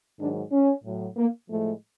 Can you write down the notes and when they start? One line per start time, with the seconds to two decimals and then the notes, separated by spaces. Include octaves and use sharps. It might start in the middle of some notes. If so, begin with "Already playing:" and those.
0.19 G#2 D#3 F#3 D4
0.51 C#4
0.84 A2 F#3
1.16 A#3
1.49 A2 F3 G#3 A3